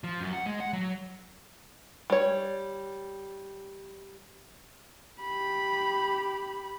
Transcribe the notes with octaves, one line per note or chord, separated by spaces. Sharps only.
F3
F#2
F#5
G#3
F#5
F#3
G3 C#5
G4 B5